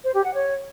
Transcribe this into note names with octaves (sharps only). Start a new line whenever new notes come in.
C5
G4
F#5
C#5